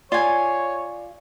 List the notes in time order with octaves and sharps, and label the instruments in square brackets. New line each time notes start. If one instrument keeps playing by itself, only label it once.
[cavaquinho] F4 G#5 [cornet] C#5 [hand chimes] D5